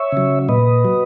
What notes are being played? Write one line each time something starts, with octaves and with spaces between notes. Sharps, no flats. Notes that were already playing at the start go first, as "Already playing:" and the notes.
Already playing: C#5 E5
C#3 F#3
A#2 B4 D#5
F#3